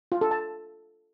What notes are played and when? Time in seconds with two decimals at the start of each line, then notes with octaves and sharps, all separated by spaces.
0.12 F4
0.21 A4
0.31 A5